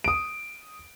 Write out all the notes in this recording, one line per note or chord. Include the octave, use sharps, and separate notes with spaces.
D#6 D7